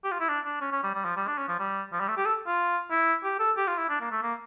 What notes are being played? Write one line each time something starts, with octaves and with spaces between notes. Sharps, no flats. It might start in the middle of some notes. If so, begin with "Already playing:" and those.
G4
F4
E4
D4
D4
C#4
C#4
G3
G3
F3
G3
D4
C#4
F3
G3
F3
G3
A3
G4
A4
F4
E4
G4
A4
G4
F4
E4
D4
A#3
A3
A#3